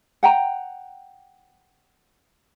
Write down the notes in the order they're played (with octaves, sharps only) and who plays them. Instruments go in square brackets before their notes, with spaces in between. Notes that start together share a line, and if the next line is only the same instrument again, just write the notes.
[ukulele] F#5 G5 A#5